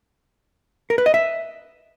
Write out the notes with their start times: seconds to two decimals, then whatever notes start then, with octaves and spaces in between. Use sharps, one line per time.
0.90 A#4
0.98 B4
1.06 D#5
1.14 E5